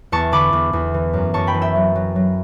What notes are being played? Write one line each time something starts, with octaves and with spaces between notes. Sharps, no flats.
E2 A5 C#6
D3 B5 D6
E2
E2
E3
F#2
F#2 A5 C#6
G5 B5
E3
E5 G5
F#3
F#3
F#3